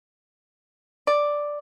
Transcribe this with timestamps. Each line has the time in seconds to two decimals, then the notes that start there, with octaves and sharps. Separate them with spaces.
1.07 D5